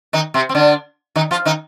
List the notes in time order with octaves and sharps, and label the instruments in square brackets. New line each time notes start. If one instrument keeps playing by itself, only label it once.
[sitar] D#3 D#4
C3 C4
C4
D3 D4
D#3 D#4
F3 F4
D#3 D#4